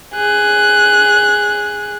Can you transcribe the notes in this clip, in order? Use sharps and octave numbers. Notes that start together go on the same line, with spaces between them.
G#4 F#6